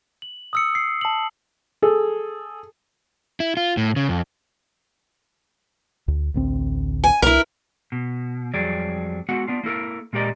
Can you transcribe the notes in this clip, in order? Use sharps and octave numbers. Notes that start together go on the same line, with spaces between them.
F#7
D#6 E6 C#7
C7
A5 F#7
G#4 A4
E4
F4
A2
C#3
F2
D2
A1 D2 C4
G#5
C2 E4 A#4
B2
F2 F#3 G3 G#4 D5
G#3 B3 F#4 F#5
B3 D4 F4
A#3 E4 A4 A#4
A#2 G#3 G4 A#4 D5 D#5